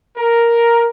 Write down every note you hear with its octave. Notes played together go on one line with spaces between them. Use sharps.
A#4